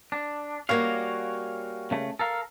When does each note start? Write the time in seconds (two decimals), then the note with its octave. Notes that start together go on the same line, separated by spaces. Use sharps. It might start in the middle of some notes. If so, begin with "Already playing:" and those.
0.12 D4
0.69 G3 A#3 C#4 F#4 C#5 F5
1.91 C#3 A3
2.19 A4 A#4 F5